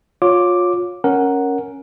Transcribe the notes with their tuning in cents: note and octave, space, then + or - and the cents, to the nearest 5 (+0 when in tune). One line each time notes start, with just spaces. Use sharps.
F4 +30 C#5 +0 D6 +0
C#4 +0 A#4 +0 F#5 +0